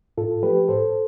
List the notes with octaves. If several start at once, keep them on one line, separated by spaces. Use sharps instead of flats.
A2 F4 A4
F3 A3 G4 B4
A2 A4 C5